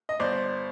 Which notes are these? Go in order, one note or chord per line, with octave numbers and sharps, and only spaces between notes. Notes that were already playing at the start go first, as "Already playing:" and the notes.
D#5
G1 C5 D5